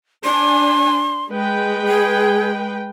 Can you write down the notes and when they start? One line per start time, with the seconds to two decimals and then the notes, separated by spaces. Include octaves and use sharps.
0.24 D4 G#5 C6
1.30 G#3 B4 G5
1.88 G#4